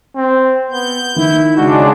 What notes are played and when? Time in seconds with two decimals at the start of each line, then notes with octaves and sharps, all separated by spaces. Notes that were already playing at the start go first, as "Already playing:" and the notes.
0.16 C4
0.71 B3 G6
1.16 D#3 E4
1.57 C#3 G#3 D4 F#4